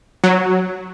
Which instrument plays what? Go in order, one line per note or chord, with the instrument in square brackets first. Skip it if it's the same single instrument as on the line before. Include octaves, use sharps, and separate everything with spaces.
[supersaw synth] F#3